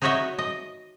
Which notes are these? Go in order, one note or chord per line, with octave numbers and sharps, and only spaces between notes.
D#4 E4 F#4 C#5 D#5 E5
D#5